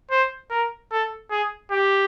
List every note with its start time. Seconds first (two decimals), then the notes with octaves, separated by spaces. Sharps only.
0.11 C5
0.51 A#4
0.92 A4
1.31 G#4
1.71 G4